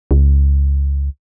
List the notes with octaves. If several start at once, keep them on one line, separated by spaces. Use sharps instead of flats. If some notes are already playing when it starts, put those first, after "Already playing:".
C#2